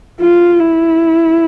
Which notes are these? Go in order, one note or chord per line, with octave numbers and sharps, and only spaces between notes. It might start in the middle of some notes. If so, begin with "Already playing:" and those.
F4
E4